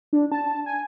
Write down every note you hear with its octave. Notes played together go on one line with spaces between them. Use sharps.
D4
A5
G#5